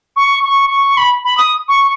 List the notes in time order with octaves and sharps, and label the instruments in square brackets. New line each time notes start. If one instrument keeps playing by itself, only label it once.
[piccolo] C#6
C#6
C#6
B5
B5
D#6
C#6